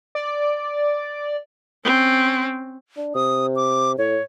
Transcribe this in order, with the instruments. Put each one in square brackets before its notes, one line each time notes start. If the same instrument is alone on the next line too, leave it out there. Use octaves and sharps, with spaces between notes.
[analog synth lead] D5
[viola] C4 C#4
[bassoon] D4
[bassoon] C3 [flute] D#6
[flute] D6
[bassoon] A2 [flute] C#5